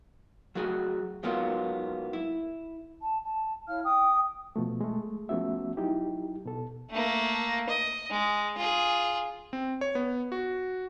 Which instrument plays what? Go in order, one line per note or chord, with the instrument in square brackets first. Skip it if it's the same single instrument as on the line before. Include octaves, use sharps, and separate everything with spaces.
[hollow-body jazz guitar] F#3 A3 F#4 G#4
G#2 F#3 A#3 B3 F4
E4
[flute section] A5
A5
E4 C#5 F5 F6
G5 D#6
[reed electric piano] B2 F3 A3
G#3 A3
F3 A3 B3 C#4 F#4 E5
F#3 D#4 E4 G4
B2 A4
[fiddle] A3 A#3
D#5
G#3
F4 G#4
[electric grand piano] C4
C#5
B3
F#4